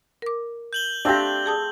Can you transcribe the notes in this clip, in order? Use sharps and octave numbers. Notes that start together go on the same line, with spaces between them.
A#4 D6
G6 F#7 G7
A3 C4 D4 G4 C5 F5 A#6
G#4 A5 D#6